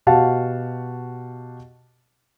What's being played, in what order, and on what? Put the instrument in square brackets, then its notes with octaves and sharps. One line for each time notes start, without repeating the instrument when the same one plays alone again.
[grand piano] B2 F#4 G4 F5 F#5 A5